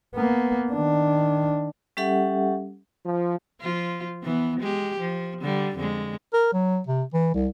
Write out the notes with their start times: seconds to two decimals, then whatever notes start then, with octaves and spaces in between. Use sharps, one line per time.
0.15 A#3 B3
0.72 D#3 D4
1.97 G3 C#4 G4 A4 E5 F#5
3.05 F3
3.61 F3 F4
4.23 E3 B3
4.60 G#3 G4
4.99 F3
5.41 D3 G3
5.76 F2 D3 G#3
6.33 A#4
6.53 F#3
6.87 C3
7.13 E3
7.34 C2